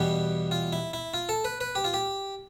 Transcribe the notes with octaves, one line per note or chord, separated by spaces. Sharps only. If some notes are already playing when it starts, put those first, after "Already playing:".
Already playing: E2 B2 G3 G4
F4
E4
E4
F4
A4
B4
B4
G4
F4
G4